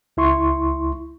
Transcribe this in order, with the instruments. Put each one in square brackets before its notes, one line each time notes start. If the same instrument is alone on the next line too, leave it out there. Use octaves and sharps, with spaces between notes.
[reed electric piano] C#2 E4 C6 C#6